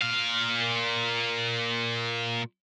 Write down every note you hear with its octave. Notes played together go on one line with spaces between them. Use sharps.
A#2 F5